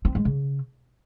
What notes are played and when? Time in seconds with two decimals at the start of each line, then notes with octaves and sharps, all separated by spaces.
0.05 C4
0.15 G#3
0.25 C#3